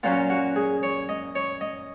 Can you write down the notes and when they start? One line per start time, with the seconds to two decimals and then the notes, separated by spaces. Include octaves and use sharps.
0.03 A#2 F#3 A#3 C#4 F4
0.30 F#4
0.56 G#4
0.83 C#5
1.09 D#5
1.35 C#5
1.61 D#5